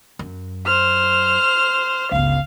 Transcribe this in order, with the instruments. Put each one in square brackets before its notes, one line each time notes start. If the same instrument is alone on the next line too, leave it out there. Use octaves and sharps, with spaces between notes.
[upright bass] F#2
[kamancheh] C5 F6
[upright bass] G1 C#2 [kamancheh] F5